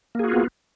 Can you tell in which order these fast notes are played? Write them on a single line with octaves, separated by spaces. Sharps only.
A#3 G#4 F#4 F4 B3